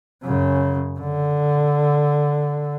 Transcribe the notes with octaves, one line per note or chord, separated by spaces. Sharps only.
F#2 C#3
D3